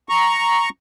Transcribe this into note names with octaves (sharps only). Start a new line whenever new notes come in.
A#5 C#6